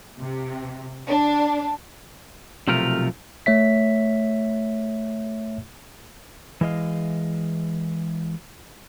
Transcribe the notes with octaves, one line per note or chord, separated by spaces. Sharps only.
C3
D4
B1 C3 F3 A3 F4 A#4
A3 C#5 E5 B6
E3 G#3 D#5 F5